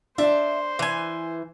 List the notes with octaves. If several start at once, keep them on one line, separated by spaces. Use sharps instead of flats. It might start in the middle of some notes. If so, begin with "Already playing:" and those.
D4 C5 E5
E3 G#5